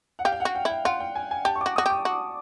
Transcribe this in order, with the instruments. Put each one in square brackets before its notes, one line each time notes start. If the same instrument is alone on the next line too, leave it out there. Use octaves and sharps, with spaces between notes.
[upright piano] F#5
[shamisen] G4 [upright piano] F5
[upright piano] G5
F#5
[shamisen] F#4
[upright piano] G5
[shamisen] E4 [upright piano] G5
[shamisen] F4 [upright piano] F#5
[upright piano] G5
G#5
G#5
[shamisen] G4 [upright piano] A5
[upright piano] C#6
[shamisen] F#4 [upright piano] D6
[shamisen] F#4 [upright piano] D#6
[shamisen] G4 [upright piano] D6
[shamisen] F#4